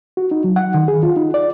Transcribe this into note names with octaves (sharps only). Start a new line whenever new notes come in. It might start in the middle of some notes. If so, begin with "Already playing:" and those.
F#4
D#4
F#3
F#5
D#3
G#4
F4
D#4
D5